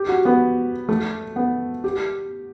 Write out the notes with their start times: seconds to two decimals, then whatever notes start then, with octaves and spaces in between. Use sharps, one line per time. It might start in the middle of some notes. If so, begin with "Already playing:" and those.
Already playing: G4
0.09 F#4
0.25 B3
0.89 A3
1.36 B3
1.84 G4